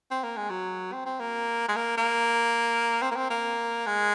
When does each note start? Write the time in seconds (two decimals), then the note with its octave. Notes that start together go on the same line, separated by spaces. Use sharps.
0.11 C4
0.23 A#3
0.37 G#3
0.50 F#3
0.93 C4
1.06 C4
1.20 A#3
1.68 G#3
1.76 A#3
1.97 A#3
3.02 C4
3.11 A#3
3.16 C4
3.30 A#3
3.87 G#3